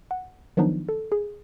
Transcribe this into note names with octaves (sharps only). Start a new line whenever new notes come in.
F#5
D#3 F3 F#3 B3 D4 D#4
A4
G#4